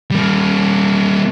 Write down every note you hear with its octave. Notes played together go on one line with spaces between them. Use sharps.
G3 A#3